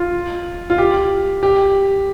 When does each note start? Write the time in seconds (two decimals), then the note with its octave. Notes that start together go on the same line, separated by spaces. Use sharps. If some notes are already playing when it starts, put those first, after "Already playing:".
Already playing: F4
0.70 F4
0.78 G4
1.43 G4